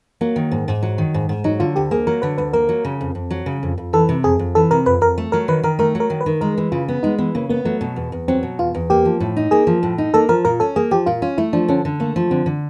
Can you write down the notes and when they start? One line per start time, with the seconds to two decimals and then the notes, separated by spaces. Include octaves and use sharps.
0.21 F#3 A#3
0.36 D#3
0.51 G#2
0.68 G#2
0.83 F#3
0.98 D#3
1.14 G#2
1.29 G#2
1.44 F#3 D#4
1.60 D3 F4
1.76 D2 G4
1.91 A#3 G#4
2.07 F#3 A#4
2.22 D3 B4
2.38 D2 B4
2.53 A#3 A#4
2.69 F#3
2.85 C#3
3.01 F2
3.15 F2
3.30 F#3
3.46 C#3
3.63 F2
3.78 F2
3.93 E3 A4
4.09 C3
4.24 F2 G#4
4.39 F2
4.55 E3 A4
4.71 C3 A#4
4.86 F2 B4
5.01 F2 A#4
5.18 A3
5.32 F#3 A#4
5.48 D#3 B4
5.63 D#3 A#4
5.79 A3 A#4
5.95 F#3
6.00 A#4
6.10 D#3
6.21 B4
6.26 D#3
6.41 G#3 A#4
6.58 E3
6.72 C#3 F4
6.88 B3
7.03 G#3 D#4
7.18 E3 B3
7.35 C#3 A#3
7.49 A#3 B3
7.65 F#3 A3
7.81 B2
7.96 E2
8.12 E2
8.28 F#3 C4
8.43 B2
8.59 E2 F4
8.75 E2
8.90 A#3 G4
9.05 F3
9.20 A2
9.37 D#4
9.51 A#3 G#4
9.67 F3
9.83 A2
9.98 D#4
10.14 A#3 A4
10.29 F3 A#4
10.45 A#2 A#4
10.60 C#4 A4
10.76 A#3 G#4
10.91 F3 G4
11.06 A#2 F4
11.22 C#4 F4
11.38 A3 E4
11.53 F3 D4
11.68 D3 C#4
11.85 D3
12.00 A3 A#3
12.16 F3
12.31 D3 C4
12.46 D3